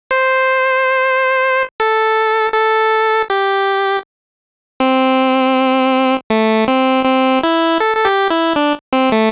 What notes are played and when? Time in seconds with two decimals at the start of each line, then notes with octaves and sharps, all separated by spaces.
0.11 C5
1.80 A4
2.54 A4
3.30 G4
4.80 C4
6.30 A3
6.68 C4
7.05 C4
7.43 E4
7.80 A4
7.97 A4
8.05 G4
8.30 E4
8.56 D4
8.93 C4
9.12 A3